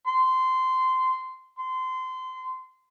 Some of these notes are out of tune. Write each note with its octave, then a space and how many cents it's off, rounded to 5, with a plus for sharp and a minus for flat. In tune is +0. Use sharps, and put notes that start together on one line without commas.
C6 -15
C6 -25